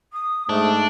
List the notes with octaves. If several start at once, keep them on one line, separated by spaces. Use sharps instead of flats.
D#6
G#2 A3 D4